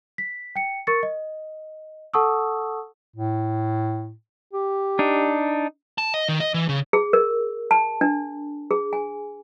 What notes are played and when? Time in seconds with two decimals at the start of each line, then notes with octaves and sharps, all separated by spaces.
0.18 B6
0.56 G5 C#7
0.87 A#4 C#6 A6 C#7
1.03 D#5
2.14 A4 F#5 A5 C#6 D#6 E6
3.16 A2
4.53 G4
4.99 D4 D#4
5.98 A5
6.14 D#5
6.29 D#3
6.40 D#5
6.54 E3
6.69 C#3
6.93 G#4
7.13 A#4
7.71 A5
8.01 D4
8.71 G#4
8.93 G#5